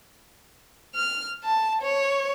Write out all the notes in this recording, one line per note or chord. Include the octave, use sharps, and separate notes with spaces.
F6
A5
C#5